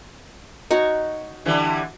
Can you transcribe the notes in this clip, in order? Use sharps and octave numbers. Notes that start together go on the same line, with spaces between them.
D#4 F#4 C#5
D3 E3 G3